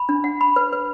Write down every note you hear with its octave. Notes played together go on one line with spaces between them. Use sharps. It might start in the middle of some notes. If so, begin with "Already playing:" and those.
Already playing: B5
D4
F#5
B5
B4
B4